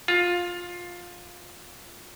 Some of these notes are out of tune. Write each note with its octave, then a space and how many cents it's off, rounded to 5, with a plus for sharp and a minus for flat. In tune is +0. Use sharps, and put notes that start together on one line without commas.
F4 +15